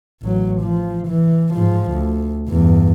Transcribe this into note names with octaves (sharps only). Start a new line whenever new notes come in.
A1 F#3
F3
E3
G#2 F3
D2
E2 G2